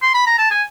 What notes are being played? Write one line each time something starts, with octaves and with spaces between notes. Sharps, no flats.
C6
B5
A#5
A5
G#5